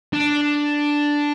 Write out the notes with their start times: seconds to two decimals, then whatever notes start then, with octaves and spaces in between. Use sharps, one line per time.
0.13 D4